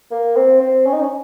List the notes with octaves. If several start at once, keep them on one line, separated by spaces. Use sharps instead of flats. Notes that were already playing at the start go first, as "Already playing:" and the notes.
A#3
C4
C4
C#4
D#4
C#4